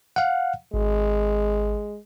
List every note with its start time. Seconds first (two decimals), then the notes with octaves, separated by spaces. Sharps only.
0.16 F5 F#5
0.74 G#1 G#3